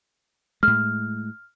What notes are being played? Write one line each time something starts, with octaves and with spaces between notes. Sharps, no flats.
A2 G#3 F6